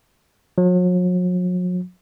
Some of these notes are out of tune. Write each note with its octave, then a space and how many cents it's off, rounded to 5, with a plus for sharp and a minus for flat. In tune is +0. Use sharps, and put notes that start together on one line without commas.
F#3 -45